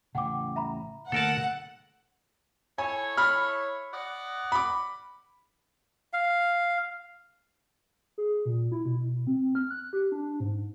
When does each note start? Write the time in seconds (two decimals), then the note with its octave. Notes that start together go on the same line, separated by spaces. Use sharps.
0.15 A1 C#3 F#5 G5 D6
0.56 E5 A#5 B5
1.12 D3 A3 A#3 A4 A#4 F#5 A5
2.78 E4 A4 C#5 G#5
3.17 B5 F6
3.94 D5 D#5 F#5
4.52 B5 D6
6.13 F5
8.18 G#4
8.45 A#2
8.72 E4
8.86 B2
9.27 C4
9.55 F6
9.70 F#6
9.93 G4
10.12 D4
10.40 G#2